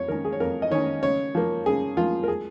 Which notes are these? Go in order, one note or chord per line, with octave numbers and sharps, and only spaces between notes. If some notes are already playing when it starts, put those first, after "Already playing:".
Already playing: F2 C#5
D#3 C#4 A#4
G#4
C#5
F2 A#4
D#5
D#3 C#4 C#5
C#3 C#5
F3 A#3
C#3 G#4
F3 A#3 F4
A#4
G#4